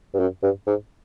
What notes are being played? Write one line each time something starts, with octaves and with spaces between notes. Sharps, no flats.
G2
F#2
G2
G#2